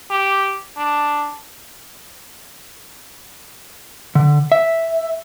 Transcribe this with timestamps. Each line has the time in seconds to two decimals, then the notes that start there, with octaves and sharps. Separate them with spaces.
0.11 G4
0.77 D4
4.15 D3
4.52 E5